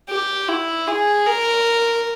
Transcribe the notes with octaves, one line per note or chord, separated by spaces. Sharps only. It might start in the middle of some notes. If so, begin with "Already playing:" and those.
G4
E4
G#4
A#4